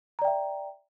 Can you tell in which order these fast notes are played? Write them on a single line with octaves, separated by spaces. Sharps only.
A#5 D5 G5 E5